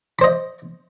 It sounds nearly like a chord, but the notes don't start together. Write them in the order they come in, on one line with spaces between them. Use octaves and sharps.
B5 C5 D#5